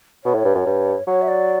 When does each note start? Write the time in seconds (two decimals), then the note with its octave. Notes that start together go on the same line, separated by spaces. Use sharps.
0.24 B2 C#5
0.34 A2
0.45 G2
0.55 F#2
0.66 G2
1.07 F#3 C#5
1.22 E5
1.28 D5